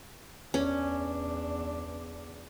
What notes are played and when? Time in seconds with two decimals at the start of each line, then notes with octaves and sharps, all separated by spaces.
0.54 E2 C#4 D4